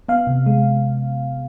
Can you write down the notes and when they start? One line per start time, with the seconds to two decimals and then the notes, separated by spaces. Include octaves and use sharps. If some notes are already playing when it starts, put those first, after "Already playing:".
0.09 B3 F5
0.27 C3
0.46 G#3